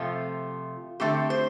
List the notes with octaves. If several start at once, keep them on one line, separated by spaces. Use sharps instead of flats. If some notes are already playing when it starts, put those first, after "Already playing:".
Already playing: C3 F3 A3 F4
D3 A3 C4 G4
C5